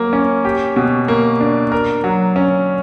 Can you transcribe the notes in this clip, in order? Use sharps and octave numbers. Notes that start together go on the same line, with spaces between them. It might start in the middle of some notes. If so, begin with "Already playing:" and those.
Already playing: F#3 A#3
C#4
G4
B2
A#3
D4
A#4
F#3
C#4